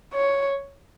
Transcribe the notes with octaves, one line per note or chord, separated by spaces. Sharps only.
C#5